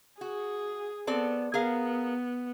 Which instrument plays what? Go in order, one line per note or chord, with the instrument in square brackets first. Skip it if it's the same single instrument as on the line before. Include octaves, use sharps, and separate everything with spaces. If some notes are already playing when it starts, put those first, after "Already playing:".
[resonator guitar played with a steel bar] F#4 [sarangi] G#4
[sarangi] B3 [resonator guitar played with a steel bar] C4 A4 D5
[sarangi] B3 [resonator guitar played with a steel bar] G#4 A#4 F5